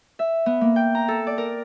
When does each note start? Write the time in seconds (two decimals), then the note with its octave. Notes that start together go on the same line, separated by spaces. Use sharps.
0.19 E5
0.46 B3
0.61 A#3
0.76 G5
0.95 A#5
1.08 A4
1.27 D5
1.38 A#4